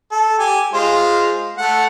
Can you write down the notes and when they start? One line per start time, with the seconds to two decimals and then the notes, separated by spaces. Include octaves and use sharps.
0.12 A4
0.39 G4 G#5
0.74 G#3 F4 C5
1.58 A3 F#5